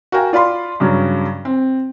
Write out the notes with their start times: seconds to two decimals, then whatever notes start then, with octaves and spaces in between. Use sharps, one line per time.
0.12 F#4 A#4 F5 G5 G#5
0.33 F4 D5 F5 B5 C6
0.80 G2 C#3 F#3
1.45 C4